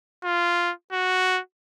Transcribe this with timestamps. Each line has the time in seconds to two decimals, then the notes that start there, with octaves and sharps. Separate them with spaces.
0.24 F4
0.92 F#4